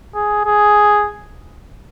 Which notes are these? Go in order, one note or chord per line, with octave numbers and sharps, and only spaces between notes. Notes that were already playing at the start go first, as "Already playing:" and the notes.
G#4
G#4